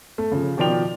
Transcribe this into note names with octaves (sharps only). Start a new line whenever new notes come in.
A3
C#3 F3
B2 D#3 F3 D5 G5 F7